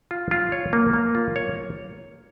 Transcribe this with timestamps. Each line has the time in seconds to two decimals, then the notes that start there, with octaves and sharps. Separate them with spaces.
0.11 F4
0.31 F4
0.52 C#5
0.73 A#3
0.93 A#3
1.15 F4
1.36 C#5